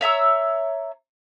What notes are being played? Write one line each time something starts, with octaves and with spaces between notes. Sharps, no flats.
C#5 E5 A#5 E6